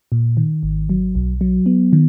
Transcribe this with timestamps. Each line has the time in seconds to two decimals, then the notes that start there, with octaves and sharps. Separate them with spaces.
0.12 A#2
0.37 D#3
0.63 G#1
0.90 F#3
1.15 B1
1.41 F#3
1.66 B3
1.93 D#3